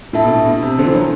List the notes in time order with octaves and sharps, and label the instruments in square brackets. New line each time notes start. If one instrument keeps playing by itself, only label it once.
[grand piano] A2 [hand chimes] D4 A4 E5 A5
[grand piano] B2
A2
B2
C3
[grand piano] D3 [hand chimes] B3 D4 A4 C5
[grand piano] E3
F#3